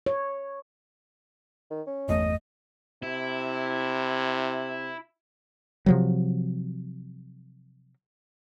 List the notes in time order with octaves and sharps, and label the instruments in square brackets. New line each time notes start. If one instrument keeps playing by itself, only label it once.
[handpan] C#5
[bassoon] D#3
C#4
[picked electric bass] G1 E2 A3 [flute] D#5
[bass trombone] C3 [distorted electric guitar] E4
[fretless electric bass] C3 F3 F#3